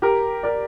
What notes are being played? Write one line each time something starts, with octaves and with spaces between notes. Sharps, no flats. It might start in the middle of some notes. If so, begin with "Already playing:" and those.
G4 A#4
A#4 D5